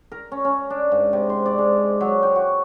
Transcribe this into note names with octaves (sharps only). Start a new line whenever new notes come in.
A#4
C#4
C#4
D4
G#2
C3
C6
D5
G#3
F#3
G5
F#4